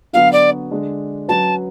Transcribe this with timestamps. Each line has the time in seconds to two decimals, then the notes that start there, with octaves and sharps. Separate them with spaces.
0.13 D3 F#3 B3 F#4 F5
0.32 D5
0.71 D3 G#3 D4
1.28 F#3 C#4 F#4 B4 A5